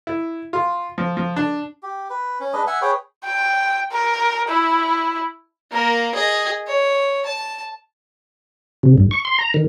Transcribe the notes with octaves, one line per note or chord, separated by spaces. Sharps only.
E4
F4
F3
F3
D4
G4
B4
C#4
G#3 D4 B4 D#5
E5 F#5 G#5
G#4 B4 C#5 G5
G5
A#4
E4
A#3 A#4
G#4 D#5
C#5
A5
C3
G2
C#6
C6
A#5
D#3